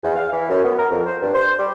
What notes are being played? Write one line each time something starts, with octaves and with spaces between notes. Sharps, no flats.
E2
F5
E3
F#2
B3
A#4
F2
C5
G2
C5
G3